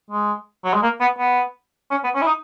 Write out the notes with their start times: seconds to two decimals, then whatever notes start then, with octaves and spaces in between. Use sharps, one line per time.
0.10 G#3
0.65 F#3
0.73 G#3
0.82 A#3
1.01 B3
1.19 B3
1.91 C#4
2.04 B3
2.15 C#4
2.22 E4
2.27 D#4